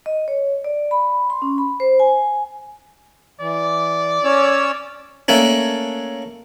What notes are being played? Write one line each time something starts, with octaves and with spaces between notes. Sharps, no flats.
D#5
C#5
D5
B5
C6
C#4
B5
C5
G#5
E3 D5
C#4 C#5 E6
A3 A#3 C#4 D4